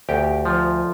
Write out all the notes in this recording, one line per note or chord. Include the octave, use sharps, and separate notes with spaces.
D2 G4 G5
F3